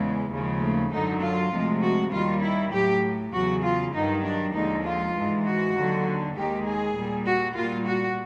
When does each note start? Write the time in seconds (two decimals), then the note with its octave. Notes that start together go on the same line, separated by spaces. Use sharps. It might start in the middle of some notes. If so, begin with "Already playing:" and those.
Already playing: E2 C#3 E3 G#3
0.31 D#2 C#3 F3 G#3
0.61 A3
0.91 F#2 D3 F#3 D#4
1.22 F4
1.52 D2 C3 F3 G#3
1.82 F#4
2.12 D#2 D#3 G3 F4
2.42 E4
2.72 A2 F#3 G4
3.33 E2 C#3 F#3 F#4
3.63 F4
3.94 G2 D#3 F#3 D#4
4.24 D4
4.54 D#2 D3 F3 G#3 D#4
4.84 F4
5.14 G#2 E3 G#3
5.45 F#4
5.75 D#2 D3 F#3
6.35 D#2 D#3 G#3 G4
6.66 G#4
6.96 A#2 G3
7.26 F#4
7.56 A#2 G3 F4
7.87 F#4